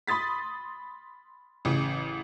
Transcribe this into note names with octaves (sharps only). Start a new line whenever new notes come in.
B5 C6 D#6 A6 B6
A1 C#3